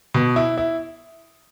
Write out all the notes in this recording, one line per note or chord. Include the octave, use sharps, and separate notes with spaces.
B2
E4
E4